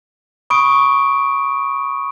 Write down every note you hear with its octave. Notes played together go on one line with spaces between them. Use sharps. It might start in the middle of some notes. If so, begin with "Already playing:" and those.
B5 C#6 D#6 D7